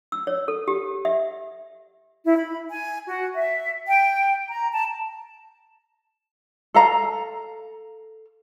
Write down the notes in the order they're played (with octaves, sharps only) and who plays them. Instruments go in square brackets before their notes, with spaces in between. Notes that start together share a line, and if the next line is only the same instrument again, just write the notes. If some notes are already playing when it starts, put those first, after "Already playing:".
[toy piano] E6
C#5
A4
G4
E5
[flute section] E4
B5
G#5
F#4
E5
G5
A#5
A5
[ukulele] A4 F5 A#5